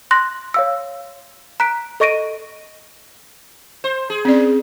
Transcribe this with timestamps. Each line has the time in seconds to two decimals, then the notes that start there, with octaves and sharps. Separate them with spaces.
0.11 C6 F#6 A#6
0.54 C#5 F5 E6
1.60 A#5 F#6 B6 D7
2.00 A4 D#5 C#6 A#6 D7 D#7
3.84 C5
4.10 G#4
4.25 C4 C#4 D5